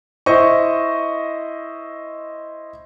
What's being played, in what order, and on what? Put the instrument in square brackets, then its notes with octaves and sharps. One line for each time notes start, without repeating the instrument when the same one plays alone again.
[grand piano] E4 C5 D#5 C#6